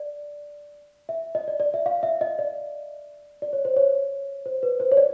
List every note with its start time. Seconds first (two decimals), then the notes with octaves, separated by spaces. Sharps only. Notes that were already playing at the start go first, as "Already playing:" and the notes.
Already playing: D5
1.09 E5
1.35 D#5
1.48 D5
1.60 D5
1.74 E5
1.86 F5
2.03 E5
2.21 D#5
2.39 D5
3.42 D5
3.53 C#5
3.65 C5
3.77 C#5
4.46 C5
4.63 B4
4.80 C5
4.92 C#5
4.97 D5